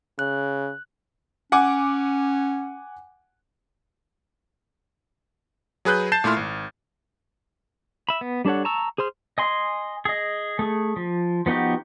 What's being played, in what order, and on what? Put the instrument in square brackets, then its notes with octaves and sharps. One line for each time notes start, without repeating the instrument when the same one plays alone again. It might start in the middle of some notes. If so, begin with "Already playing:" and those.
[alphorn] C#3 [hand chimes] F#6
[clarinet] C#4 [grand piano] F#5 G#5 D6
[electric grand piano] F#3 G#4 B4 F#6 G6
A5 G6 A6 C7 E7
A#2 A3 E4 C6 F6
G#1
[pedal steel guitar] E5 B5
B3
G3 D4 A4 C#5 F#5
A5 A#5 C#6 E6
G#4 C5 C6 F6
D#5 G#5 C6
G#4 D#5
A3 G#4
F3
F3 B3 D#4 F#4 G4